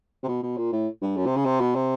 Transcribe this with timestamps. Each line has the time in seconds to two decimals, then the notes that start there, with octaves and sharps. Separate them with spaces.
0.23 C3
0.28 B2
0.43 B2
0.57 A#2
0.72 A2
1.02 G2
1.17 F#2
1.26 C3
1.36 C#3
1.45 C3
1.60 B2
1.75 C3